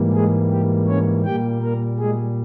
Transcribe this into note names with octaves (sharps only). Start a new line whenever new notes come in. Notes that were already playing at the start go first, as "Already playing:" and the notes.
Already playing: G#2 E3 G3 A#3
G#3 G#4
G4
C#4 C#5
A#2 G3 A#3 G4 G5
A#3 A#4
G#3 G#4